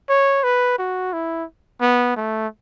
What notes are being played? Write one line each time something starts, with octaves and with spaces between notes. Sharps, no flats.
C#5
B4
F#4
E4
B3
A3